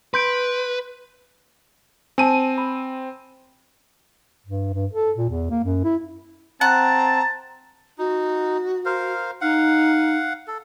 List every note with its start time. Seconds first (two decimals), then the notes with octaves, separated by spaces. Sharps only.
0.14 B4 C6 G6 D7
2.18 C4 G#5 A5 D#7
2.58 B5
4.46 G2
4.73 G2
4.93 A4
5.16 A#2
5.30 E2
5.50 A#3
5.64 F#2
5.84 E4
6.61 C4 F#5 A5 A#5
7.98 D#4 F#4
8.85 A#4 C5 F5
9.41 D#4 F5 F#5
10.48 A4